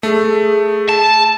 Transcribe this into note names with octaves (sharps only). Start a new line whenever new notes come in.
A3 G#4
A5